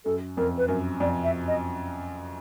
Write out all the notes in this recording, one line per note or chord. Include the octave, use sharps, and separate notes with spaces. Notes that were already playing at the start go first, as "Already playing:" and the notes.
F#2 A4
F2 A#4
B4
F#2 A#4
F2 D5
E5
D#5